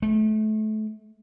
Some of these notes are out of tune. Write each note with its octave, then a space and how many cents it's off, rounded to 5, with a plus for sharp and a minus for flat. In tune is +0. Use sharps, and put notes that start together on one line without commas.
A3 -30